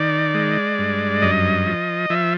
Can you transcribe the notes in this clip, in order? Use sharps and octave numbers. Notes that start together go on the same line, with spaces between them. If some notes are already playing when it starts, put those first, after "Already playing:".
Already playing: D#3 D5
G#3
G2
F#2 D#5
F3
F3 E5